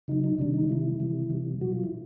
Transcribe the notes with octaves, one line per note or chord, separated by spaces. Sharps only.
C#3 F#3 D#4
D#4
C3 D#3 G3 D4
D#4
C3 D#3 G3 E4
C3 E3 G3
C3 E3 G3
B2 F#3 F#4
F4
E4